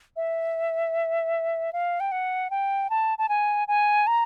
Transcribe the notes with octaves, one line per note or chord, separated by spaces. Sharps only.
E5
F5
G5
F#5
G5
A5
A5
G#5
G#5
A#5